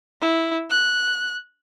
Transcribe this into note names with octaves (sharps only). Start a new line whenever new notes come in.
E4
F#6